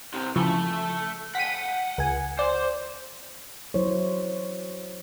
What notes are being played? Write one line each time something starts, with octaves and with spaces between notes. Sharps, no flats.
C2 C3
C#3 E3 F3 A3 A4
F#5 G5 B6 D#7
C#2 G#5
C5 D5
F#3 E4 C5 C#5